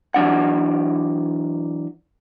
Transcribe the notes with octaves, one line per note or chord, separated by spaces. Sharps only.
E3 F#3 D4 F#5